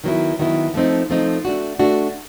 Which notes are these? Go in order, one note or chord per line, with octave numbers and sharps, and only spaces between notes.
D#3 F#3 B3 E4
D#3 F#3 B3 E4
F3 A3 C4 D#4
F3 A3 C4 D#4
A3 D4 F#4
A3 D4 F#4